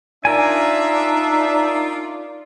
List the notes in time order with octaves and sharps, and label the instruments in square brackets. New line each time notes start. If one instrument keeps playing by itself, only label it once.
[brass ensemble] D4 E5 [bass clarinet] D#4 [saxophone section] F4 D5 [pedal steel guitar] A#4 G#5